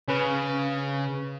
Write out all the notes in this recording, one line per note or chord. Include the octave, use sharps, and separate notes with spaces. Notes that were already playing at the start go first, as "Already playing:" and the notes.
C#3 C#4 B4